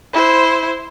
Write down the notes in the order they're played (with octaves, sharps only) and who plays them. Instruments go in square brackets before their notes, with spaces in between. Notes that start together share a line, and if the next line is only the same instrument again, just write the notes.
[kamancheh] E4 C5